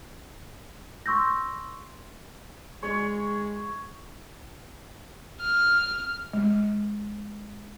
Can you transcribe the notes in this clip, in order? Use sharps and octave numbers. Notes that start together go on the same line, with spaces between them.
C6 C#6 E6 G6 A#6
G#3 C#5
F6
G#3